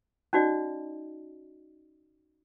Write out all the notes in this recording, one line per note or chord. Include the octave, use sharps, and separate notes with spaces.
C#4 D#4 F#4 D5 D#5